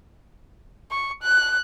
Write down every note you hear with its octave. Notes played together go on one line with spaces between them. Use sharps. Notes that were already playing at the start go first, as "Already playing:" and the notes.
C#6
F#6